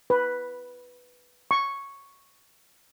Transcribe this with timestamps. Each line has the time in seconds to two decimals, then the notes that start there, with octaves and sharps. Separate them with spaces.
0.10 B4
1.51 C#6